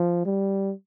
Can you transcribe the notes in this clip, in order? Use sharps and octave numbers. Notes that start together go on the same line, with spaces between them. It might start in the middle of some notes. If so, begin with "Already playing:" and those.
Already playing: F3
G3